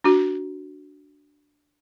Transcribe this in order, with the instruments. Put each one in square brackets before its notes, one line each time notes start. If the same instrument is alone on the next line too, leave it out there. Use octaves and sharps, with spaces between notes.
[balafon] D4 F#4